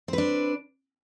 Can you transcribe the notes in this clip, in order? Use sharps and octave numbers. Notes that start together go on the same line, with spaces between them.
C4 D4 B4